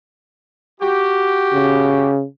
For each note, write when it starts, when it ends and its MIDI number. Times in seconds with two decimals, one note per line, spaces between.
0.81 2.11 66
0.81 2.11 67
1.53 2.24 49